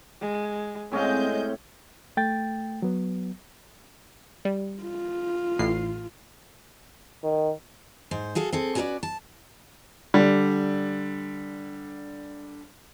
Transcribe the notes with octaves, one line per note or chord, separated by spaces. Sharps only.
G#3
A2 G#3 C4 C#4 D#5 F5 G6
A3 G5 A6
F#3 B3
G3
F4
A1 A2 C7
D#3
G#2 C5
F#4 G#4 A4 F5
C4 G#4 A4
C#4 F#4 G#4 A#4 B4 D5
A5
D3 G3